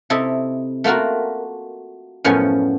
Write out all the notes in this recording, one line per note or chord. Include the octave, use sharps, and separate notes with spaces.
C3 E4 A4 D#5 E5
A3 A#3 F4 F#4 A#4
F#2 A2 F3 B3 C#4 G#5